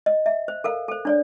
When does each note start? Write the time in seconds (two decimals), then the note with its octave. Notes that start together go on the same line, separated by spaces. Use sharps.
0.06 D#5
0.26 E5
0.48 C5
0.64 A4 A#4 F5
0.88 A4 C5
1.05 D4 C#5 D5